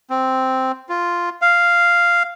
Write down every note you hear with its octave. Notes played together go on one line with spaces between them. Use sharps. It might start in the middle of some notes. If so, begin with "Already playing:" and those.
C4
F4
F5